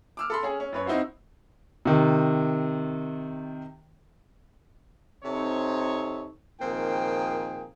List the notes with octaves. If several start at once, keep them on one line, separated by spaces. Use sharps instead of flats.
D6 E6 F6
A4 B5 C6
C#4 G#4
C#4
F#2 B4 C#5
C4 D#4 E4 F#4 C5
C3 D#3
C3 C4 D#4 A4 C#5
A#2 D#3 F3 C4 G#4 G5